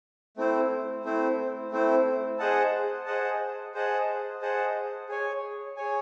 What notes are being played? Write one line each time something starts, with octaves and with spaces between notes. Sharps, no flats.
A3 C4 E4 C5
A3 C4 E4 C5
A3 C4 E4 C5
G#4 C5 D#5 F#5 A5
G#4 C5 D#5 F#5 A5
G#4 C5 D#5 F#5 A5
G#4 C5 D#5 F#5 A5
G#4 C#5 G#5
G#4 C#5 G#5